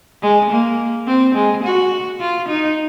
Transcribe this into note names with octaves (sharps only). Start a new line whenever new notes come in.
G#3
A#3
C4
G#3
F#4
F4
D#4